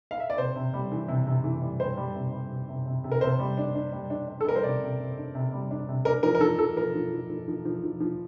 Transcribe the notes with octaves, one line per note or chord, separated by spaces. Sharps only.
F5
E5
D5
C3 C5
C3
G3
E3
C3
C3
E3
G3
G3 C5
G3
C3
G3
C3
C3
C3
C3
A#4
C3 C5
G3
D4
D4
G3
D4
D4
A4
G3 A#4
C5
C3 D5
C3
C3
D4
C3
G3
D4
C3
D4 A#4
F3 A#4
A#4
F3 A4
F3 A4
F3 A#4
F3
F3
F3
F3
F3
F3
F3